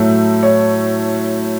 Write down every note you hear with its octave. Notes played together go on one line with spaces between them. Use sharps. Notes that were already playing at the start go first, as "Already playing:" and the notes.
Already playing: A2 F#3 A3
C#5